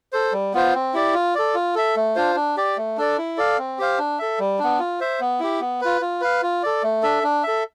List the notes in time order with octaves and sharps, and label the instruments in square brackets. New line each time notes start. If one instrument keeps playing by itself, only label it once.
[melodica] A4 C5
G3
B3 F4 C5
C4
E4 G4 D5
F4
A4 D5
F4
A4 E5
A3
D4 F4 C5
D4
G4 D5
A3
D4 A4 D5
E4
A4 D5 F5
C4
G4 C5 F5
D4
A4 E5
G3
B3 D4
F4
C5 E5
B3
E4 G4
B3
F4 B4
F4
B4 F5
F4
A4 D5
A3
D4 A4 E5
D4
A4 E5